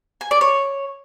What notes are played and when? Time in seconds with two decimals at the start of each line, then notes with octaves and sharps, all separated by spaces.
0.21 G#5
0.31 D5
0.41 C#5